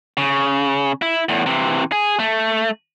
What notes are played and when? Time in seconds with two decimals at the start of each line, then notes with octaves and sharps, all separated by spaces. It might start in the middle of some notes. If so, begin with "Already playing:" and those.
0.17 C#3
1.02 E4
1.29 E2 A2
1.46 C3 E3
1.92 G#4
2.19 A3